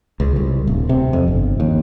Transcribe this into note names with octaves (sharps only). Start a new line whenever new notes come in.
C#2
C2
D1
C3
F2
G1
D#2